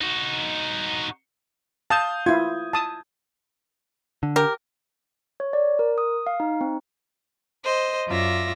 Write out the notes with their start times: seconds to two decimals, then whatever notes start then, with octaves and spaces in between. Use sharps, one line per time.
0.01 D#4 F#4
1.90 F5 A5 D#6 G6
2.26 E4 F4 G#6
2.73 A5 D#6
4.23 D3
4.36 G4 A#4
5.40 C#5
5.53 D5
5.79 A#4
5.98 D#6
6.27 F5
6.40 D#4
6.61 C4
7.65 C5 D#5
8.08 F#2 F4 D5 E5 A#6